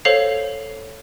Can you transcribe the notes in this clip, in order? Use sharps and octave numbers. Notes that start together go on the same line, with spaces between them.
A4 C5 C#5 F5 C7 F7